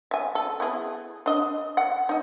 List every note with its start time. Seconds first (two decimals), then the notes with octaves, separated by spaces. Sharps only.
0.11 E5 G#5
0.35 A4
0.60 B3 E4 G#4
1.26 D4 D#5
1.77 F#5
2.09 D#4 D#5